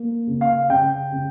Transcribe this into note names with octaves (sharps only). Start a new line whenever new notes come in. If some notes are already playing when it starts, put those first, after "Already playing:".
Already playing: A#3
C#3
F5
C#3 G5
C#3